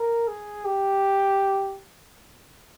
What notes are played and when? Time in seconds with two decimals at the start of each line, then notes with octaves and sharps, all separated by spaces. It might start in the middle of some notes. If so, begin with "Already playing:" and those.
Already playing: A#4
0.28 G#4
0.65 G4